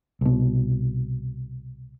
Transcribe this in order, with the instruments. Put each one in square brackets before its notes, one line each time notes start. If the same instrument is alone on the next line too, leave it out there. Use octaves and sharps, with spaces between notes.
[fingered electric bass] C2 B2